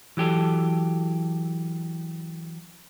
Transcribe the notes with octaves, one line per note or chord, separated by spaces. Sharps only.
E3 F#3 G4 A4